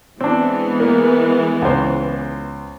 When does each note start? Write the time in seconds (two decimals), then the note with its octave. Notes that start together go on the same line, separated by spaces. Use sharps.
0.21 E3 G#3 B3 C4 D4
0.80 A#3
1.62 C#2 C5